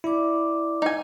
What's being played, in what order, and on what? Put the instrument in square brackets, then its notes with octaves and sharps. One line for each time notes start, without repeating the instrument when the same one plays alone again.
[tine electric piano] E4 [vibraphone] D5 D6
[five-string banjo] D#4 G#5